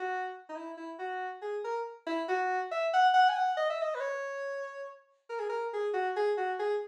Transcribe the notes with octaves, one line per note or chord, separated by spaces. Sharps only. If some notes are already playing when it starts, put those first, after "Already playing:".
Already playing: F#4
D#4
E4
E4
F#4
G#4
A#4
E4
F#4
E5
F#5
F#5
G#5
F#5
D#5
E5
D#5
B4
C#5
A#4
G#4
A#4
G#4
F#4
G#4
F#4
G#4